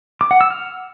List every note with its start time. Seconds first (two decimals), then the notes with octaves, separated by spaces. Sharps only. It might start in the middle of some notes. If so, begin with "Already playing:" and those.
0.21 D6
0.31 F#5
0.41 E6
0.50 F6